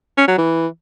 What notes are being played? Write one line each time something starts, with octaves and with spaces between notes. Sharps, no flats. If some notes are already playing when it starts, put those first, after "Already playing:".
C#4
F#3
E3